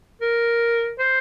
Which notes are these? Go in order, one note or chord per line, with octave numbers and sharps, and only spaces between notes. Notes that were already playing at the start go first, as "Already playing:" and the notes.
A#4
C5